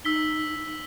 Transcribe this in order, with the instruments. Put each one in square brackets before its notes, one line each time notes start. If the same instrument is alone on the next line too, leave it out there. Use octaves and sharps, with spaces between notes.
[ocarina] D#4 [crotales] E6 B6 G7